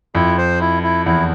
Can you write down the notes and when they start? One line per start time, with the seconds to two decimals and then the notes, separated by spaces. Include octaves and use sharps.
0.15 F2 E4
0.38 C5
0.60 E4
0.83 E4
1.06 E2 E4